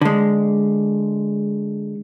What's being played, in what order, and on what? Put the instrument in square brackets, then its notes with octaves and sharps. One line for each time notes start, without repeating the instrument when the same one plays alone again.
[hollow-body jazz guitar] D3 G#3